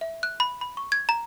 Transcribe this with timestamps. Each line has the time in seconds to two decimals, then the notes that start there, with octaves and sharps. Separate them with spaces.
0.01 E5
0.23 F#6
0.40 B5
0.61 B5
0.77 C#6
0.92 G#6
1.09 A#5